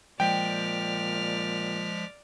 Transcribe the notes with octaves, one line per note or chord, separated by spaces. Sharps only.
A#2 F3 G#3 D5 G5 F6 B6